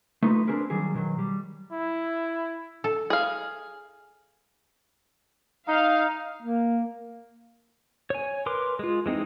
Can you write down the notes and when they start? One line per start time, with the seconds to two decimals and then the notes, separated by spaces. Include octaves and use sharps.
0.23 A3 B3 D#4 F4 B4
0.47 C4 D4 F#4 G#4 A#4 B4
0.70 D#3 F#3 G3 G#4
0.94 B2 D3 D#3 F#3
1.19 G3
1.72 E4
2.84 A4
3.10 G#4 F5
5.68 D#4 F5
6.42 A#3
8.10 C#5 G#5
8.46 A#4 B4 C6 D6
8.79 G#3 F4
9.06 E3 G#3 C4 D#4